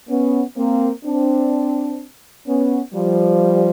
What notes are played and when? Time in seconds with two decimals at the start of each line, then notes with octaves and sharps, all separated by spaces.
0.09 B3 C#4
0.56 A#3 C4
1.04 C4 D4
2.46 B3 C#4
2.93 F3 G3